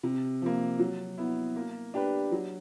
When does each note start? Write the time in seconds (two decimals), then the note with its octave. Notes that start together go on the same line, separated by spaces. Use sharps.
0.03 C3
0.42 F3 A#3
0.79 F#3
1.18 B3 E4
1.56 A#3
1.94 D4 G4 B4
2.32 F#3